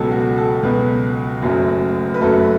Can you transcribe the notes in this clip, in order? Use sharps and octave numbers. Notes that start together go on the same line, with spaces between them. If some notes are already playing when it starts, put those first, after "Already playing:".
Already playing: C#2 B2 F#3 A4
F#4
A4
C#2 B2 F#3 B4
F#1 F#2 F#3 A3
B4
F#1 F#2 F#3 A3 A4